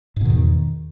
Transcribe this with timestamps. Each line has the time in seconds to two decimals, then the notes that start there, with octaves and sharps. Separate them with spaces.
0.16 G#2
0.21 B2
0.25 D#3
0.30 E2